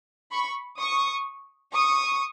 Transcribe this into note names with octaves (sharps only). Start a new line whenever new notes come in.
B5 C#6
C#6 D#6
C#6 D#6